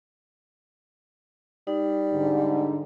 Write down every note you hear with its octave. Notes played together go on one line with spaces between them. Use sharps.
G3 D#4
G#2 D3